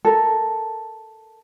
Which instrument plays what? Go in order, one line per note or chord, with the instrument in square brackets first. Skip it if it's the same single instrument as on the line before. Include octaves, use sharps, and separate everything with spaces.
[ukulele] A4 A#4